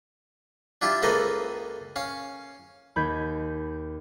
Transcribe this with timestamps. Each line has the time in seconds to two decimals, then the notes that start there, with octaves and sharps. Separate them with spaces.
0.82 D4 E4 F4 G4
1.02 C#2 A#3 A4 B4 C5 D#5
1.96 C#4 F5
2.96 D#2 B5 G6 G#6